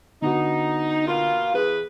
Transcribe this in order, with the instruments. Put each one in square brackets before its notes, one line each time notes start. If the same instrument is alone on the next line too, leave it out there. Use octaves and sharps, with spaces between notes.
[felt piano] D3 B3 F#4 [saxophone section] D#4
[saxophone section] B2 A#3 F4
[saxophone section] E2 B3 B4 [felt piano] G#4